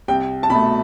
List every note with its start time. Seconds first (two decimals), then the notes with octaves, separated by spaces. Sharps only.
0.08 C2 G5
0.43 A5
0.50 B2 B5
0.55 A3